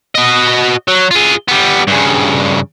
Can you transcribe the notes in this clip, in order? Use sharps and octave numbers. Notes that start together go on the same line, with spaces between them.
F#4 D#5
F#3
F4 G#4
G3 B3
G2 C#3